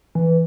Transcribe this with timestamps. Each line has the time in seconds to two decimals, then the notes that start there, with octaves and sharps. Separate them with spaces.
0.15 E3